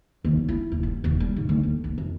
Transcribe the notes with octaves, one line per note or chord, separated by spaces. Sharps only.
D#2
F#3
E4
D#1
G2
D#1
G3
G#2
D2
D#2
D2
F2